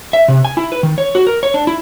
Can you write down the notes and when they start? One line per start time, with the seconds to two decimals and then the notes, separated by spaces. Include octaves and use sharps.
0.13 E5
0.28 C3
0.45 G#5
0.57 E4
0.72 B4
0.83 D#3
0.98 C#5
1.15 F#4
1.27 A#4
1.43 C#5
1.54 D4
1.67 E4